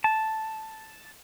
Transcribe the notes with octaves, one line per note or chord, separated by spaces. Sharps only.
A5